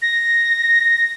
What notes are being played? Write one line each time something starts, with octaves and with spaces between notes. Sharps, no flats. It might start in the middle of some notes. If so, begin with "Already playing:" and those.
A#6